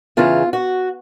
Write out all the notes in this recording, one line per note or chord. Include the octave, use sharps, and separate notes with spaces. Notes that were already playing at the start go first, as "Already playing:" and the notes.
E2 C#3 E3 F4
F#4